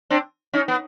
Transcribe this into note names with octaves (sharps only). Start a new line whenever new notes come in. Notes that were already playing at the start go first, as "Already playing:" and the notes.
C4 D4
C#4 D#4
B3